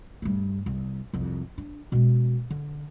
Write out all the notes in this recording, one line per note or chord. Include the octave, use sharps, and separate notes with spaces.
G2 A3
C2
C2 F2
D4
B2 G#3
D3